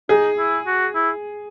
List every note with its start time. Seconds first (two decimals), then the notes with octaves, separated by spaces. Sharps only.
0.09 D#4 G#4
0.38 E4
0.67 F#4
0.95 E4